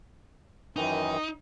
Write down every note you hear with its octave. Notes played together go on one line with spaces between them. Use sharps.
F#2 D#3 E3 D#4